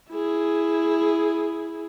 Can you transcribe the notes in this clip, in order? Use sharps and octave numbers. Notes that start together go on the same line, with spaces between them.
E4 G#4